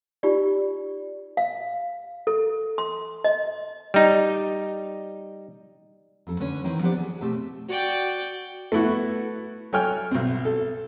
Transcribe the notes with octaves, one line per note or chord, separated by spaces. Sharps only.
D#4 F4 G4 D5
F5
A4
C6
D#5
G3 D#4
F2 C4 A4
D3 C#4 B4 C#5
D#3 E3 C4 D#4 E4 B4
F3 B3 D4 G4 C5 D5
G#4
B2 A3 C4 G4 E5 A5
F#4 D5 G5
A3 B3 E4 F#4
F#3 A4 C#5 G5 G#5 F6
B1 C4
A4